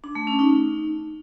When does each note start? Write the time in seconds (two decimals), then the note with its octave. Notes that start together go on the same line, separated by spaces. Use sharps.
0.04 D4
0.15 A3
0.27 C#4
0.39 D#4